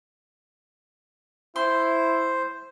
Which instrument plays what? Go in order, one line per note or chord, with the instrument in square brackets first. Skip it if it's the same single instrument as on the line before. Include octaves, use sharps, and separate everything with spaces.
[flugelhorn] E4 [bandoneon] C5 [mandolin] C6